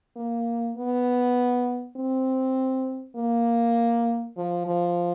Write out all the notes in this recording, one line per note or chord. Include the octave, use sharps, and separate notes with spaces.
A#3
B3
C4
A#3
F3
F3